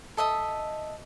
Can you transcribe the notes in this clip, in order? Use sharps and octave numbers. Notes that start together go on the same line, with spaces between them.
A4 D#5 E5 D#6